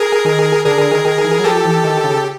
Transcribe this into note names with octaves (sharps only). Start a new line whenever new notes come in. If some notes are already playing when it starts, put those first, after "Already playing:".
Already playing: G#4 A#4
D#3
D3 G#4 A#4
D3
D#3
D#3
E3
F#3
F3 G4 A4
E3
D#3
C#3